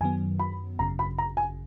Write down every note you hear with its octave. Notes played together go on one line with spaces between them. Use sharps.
F#2 D#3 F#3 B3 G#5
B5
G#1 F#2 C#3 A#5
B5
A#5
G#5